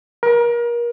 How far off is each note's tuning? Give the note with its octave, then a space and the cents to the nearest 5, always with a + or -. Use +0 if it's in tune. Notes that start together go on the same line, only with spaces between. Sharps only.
A#4 +30